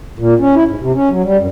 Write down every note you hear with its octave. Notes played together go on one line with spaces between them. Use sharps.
A#2
C#4
E4
G#2
C3
C#4
F#3
G3
F#2